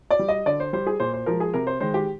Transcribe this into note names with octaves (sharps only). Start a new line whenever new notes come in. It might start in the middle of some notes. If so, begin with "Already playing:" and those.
D5
G3
D#5
D3 D5
C5
G3 C5
G#4
A#2 C5
C5
F3 G#3 A#4
G#4
C3 A#4
C5
D#3 G#3 C5
G4